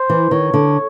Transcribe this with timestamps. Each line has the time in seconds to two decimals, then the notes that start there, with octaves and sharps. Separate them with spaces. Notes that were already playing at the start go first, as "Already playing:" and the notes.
Already playing: C5
0.10 E3
0.31 D#3 C#5
0.54 D3